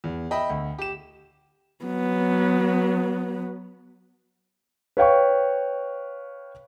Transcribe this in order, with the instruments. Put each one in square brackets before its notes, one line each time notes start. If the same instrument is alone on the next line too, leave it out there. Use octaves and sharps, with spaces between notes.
[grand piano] E2
D#5 E5 G5 B5
D2
G4 E7
[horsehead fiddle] F#3 B3
[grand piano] B4 C#5 F5 G5 C#6